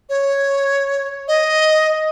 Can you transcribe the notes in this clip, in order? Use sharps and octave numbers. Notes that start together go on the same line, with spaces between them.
C#5
D#5